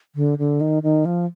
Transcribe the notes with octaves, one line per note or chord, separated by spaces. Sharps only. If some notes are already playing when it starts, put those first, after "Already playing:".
D3
D3
D#3
D#3
F3